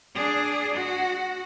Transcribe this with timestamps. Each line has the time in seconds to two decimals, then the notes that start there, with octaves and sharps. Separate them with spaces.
0.15 D4 G#4
0.74 F#4